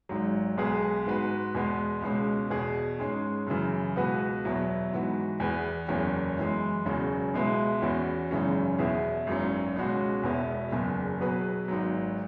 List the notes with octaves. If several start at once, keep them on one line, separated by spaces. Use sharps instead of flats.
G#1 G#2 F#3
B1 B2 G#3 B3 G#4
G#2 G#3 B3 F#4 B4
E2 B2 G#3 B3
C#2 B2 G#3 C#4
E2 B2 B3 G#4
G#2 G#3 C#4 G#4
F#2 C#3 E3
C#2 B2 B3 F#4 B4
E2 B2 F#3 E4
G#2 E3 B3 F#4
E2 E3 B3 G#4 B4
F#1 E2 E3 C#4
F#2 E3 G#3
E1 E2 C#3 F#3 C#4
C#2 B2 G#3 B3 E4
E2 E3 C#4 F#4
G#1 F#2 C#3 E3 C#4
E2 B2 B3 E4 G#4
G#1 F#2 F#3 C#4
C#2 B2 G#3 C#4 F#4
E1 E2 B2 B3 E4
F#1 E2 C#3
B2 F#3 B3 G#4 B4
G#1 G#2 F#3